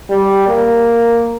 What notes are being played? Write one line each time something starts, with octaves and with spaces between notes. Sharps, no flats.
G3
A#3